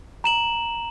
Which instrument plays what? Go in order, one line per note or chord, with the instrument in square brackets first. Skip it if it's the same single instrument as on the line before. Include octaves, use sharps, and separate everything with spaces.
[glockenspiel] A#5 E7 F#7